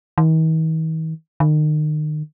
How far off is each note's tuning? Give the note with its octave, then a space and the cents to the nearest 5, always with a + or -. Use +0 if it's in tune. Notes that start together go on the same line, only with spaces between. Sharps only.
D#3 +45
D#3 -35